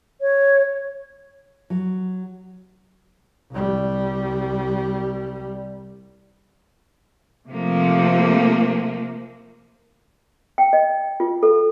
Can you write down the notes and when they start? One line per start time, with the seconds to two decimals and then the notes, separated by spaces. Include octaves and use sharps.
0.21 C#5
1.70 F#3
3.52 C2 G3
7.49 C3 F3 A3 A#3
10.58 G5
10.73 D#5
11.20 F4
11.43 A4